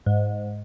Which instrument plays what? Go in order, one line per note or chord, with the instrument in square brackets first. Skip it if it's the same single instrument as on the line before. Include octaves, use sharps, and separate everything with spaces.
[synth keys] G#2